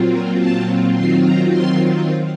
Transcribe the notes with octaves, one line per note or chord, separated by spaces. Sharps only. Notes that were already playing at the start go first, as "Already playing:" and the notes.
Already playing: A#2 F#3 C4 F4
A#4
A5
D#3 F#3 C4 F4 C6
A#5
C6